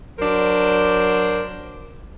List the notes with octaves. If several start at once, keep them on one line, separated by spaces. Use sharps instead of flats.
F#3 D4 A#4 C5